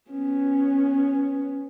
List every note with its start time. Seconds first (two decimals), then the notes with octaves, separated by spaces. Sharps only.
0.11 B3 C#4